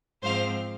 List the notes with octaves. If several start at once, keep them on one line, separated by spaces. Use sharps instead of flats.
G#2 F3 C4 C5 F5